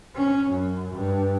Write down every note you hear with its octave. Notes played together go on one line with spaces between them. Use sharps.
C#4
F#2
G2